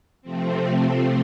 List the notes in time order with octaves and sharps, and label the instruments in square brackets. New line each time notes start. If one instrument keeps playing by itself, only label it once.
[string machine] C3 F3 A3 C4